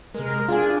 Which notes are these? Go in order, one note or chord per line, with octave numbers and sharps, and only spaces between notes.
C3 G#3 A#4
D4 F4 G#4 G#5